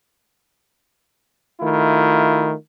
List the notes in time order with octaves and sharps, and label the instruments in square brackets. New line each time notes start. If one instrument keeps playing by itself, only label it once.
[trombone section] D#3 A3 E4 F4